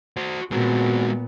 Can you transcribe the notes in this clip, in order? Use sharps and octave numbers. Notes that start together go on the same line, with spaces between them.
F#4 C5
A#2 G#3 B3 C4 F#4